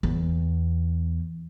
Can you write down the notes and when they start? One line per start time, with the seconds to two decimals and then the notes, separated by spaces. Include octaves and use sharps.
0.03 E2